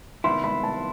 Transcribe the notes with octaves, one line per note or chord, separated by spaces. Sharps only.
C3 D#3 G3 B3 E4 C6
B5
A5